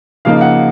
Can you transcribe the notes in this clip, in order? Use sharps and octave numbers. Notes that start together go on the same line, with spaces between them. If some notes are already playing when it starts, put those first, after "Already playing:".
C#3 F3 A#3 D#4 F5
F#5